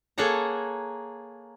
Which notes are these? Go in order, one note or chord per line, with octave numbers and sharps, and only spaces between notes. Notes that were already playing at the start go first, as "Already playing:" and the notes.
A#3 G#4 A4 C#5 F#5 A#5